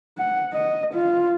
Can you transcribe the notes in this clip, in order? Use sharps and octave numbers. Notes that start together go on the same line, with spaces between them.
F#5
D#5
F4